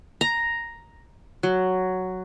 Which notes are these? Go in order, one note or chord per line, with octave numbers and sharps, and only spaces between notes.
A#5
F#3